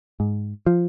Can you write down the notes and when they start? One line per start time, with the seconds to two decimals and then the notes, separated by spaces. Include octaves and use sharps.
0.20 G#2
0.66 F3